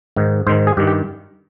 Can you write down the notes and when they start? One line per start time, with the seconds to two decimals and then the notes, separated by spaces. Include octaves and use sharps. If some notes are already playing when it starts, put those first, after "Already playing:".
0.16 G#2 D#3
0.47 G#2 C5
0.49 D#3
0.67 G#4
0.77 G2 D#3 G4
0.87 G4